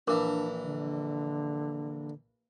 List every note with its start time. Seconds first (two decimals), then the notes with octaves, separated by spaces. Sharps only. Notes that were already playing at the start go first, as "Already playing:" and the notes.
0.08 A#1 E3 D4 A#4 D6
0.63 D3